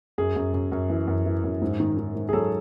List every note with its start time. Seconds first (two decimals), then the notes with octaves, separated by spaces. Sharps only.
0.18 F#2 G#4
0.36 F#2
0.54 F#2
0.72 F#2
0.90 E3
1.08 F#2
1.26 E3
1.44 F#2
1.62 G#2
1.80 D#3
1.98 D#3
2.15 G#2
2.29 G#4
2.33 F#3 A4